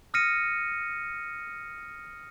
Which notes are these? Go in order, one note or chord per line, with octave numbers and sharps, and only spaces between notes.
D#6 F6 A#6 C#7 D#7